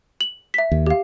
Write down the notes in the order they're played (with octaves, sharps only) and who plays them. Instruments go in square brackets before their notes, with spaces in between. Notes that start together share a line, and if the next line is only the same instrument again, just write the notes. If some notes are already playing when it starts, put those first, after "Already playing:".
[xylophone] F#7
E5 B6
[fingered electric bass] D#2
[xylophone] G4 F5